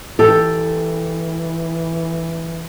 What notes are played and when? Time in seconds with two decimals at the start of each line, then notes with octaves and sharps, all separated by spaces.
0.19 E3 G4 A4